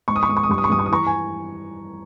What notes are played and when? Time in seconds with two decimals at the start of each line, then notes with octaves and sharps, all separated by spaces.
0.08 G#2 C#6
0.16 D#6
0.23 C#6
0.28 G#2 D#6
0.37 C#6
0.43 D#6
0.49 G2 C#6
0.58 D#6
0.64 C#6
0.70 G2 D#6
0.79 C#6
0.86 D#6
0.90 E3 A#5 C#6
1.07 G#5